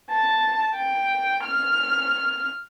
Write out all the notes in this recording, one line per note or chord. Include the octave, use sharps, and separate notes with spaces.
A5
G5
F6